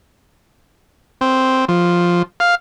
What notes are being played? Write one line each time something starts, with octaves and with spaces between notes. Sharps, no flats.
C4
F3
F5